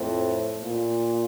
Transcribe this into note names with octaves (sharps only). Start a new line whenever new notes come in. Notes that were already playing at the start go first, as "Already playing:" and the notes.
Already playing: F2 A2
A#2